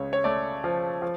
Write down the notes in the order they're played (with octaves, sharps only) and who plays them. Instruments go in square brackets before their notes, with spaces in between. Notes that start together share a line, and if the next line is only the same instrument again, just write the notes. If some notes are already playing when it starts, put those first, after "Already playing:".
Already playing: [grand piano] C#2 C#3 C#5
C#5
A3 D5
F3
F3